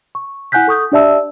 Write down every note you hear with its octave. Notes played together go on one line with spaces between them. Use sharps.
C#6
E4 F#5 G#5 F#6 G6 B6
A4 C#6 D#6 G6
D4 G4 D5 E5 A5 E6